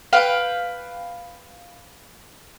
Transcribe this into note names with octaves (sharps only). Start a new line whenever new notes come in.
B4 F5 G5